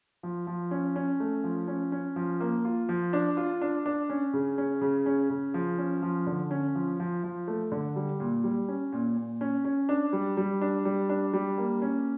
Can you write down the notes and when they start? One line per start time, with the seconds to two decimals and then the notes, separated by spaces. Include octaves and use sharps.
0.23 F3
0.47 F3
0.71 C#4
0.96 C#4
1.20 A3
1.44 F3
1.68 C#4
1.92 C#4
2.16 F3
2.40 A#3
2.65 F4
2.89 F3
3.13 D4
3.37 F4
3.61 D4
3.86 D4
4.10 C#4
4.33 C#3
4.58 C#4
4.81 C#3
5.06 C#4
5.30 C#3
5.54 F3
5.78 C#4
6.02 F3
6.27 D3
6.51 C#4
6.75 F3
7.00 F3
7.24 F3
7.48 A3
7.72 D3
7.96 G3
8.20 A#2
8.44 G3
8.68 C#4
8.93 A#2
9.17 A#2
9.41 C#4
9.65 C#4
9.89 D4
10.13 G3
10.37 G3
10.61 D4
10.85 G3
11.09 D4
11.33 G3
11.58 A#3
11.82 C#4